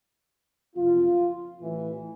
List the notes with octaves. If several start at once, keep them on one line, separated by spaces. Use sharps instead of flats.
F#1 F2 C3 F3 F4
A1 A2 E3